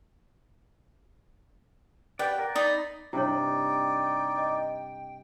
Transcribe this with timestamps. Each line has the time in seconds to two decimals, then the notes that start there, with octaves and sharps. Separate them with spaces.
2.19 G4 B4 D5 F#5 G5
2.38 A#4 D5
2.56 D#4 D5 A#5 B5 D#6
3.13 G2 C3 D#4 E4 C#5 D5 G5
4.38 D#5